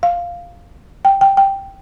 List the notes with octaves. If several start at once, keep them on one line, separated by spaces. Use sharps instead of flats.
F5
G5
G5
G5